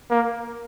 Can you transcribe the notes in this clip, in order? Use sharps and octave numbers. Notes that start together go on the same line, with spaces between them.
A#3